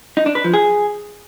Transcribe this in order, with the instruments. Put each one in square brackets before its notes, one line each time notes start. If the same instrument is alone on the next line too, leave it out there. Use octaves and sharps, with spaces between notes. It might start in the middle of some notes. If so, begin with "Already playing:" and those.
[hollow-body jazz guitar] D#4
D4
B4
F3
G#4